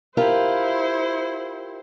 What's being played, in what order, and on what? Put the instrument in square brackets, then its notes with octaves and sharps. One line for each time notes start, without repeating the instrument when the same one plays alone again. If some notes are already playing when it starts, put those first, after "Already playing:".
[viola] E4 C5 [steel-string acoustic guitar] F4 G4 A#4